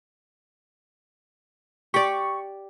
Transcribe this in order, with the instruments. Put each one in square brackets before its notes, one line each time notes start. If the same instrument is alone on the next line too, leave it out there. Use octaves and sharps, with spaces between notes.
[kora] G4 D5 [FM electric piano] C#6